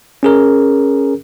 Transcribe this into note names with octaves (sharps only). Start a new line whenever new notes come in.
C#4 G#4 A#4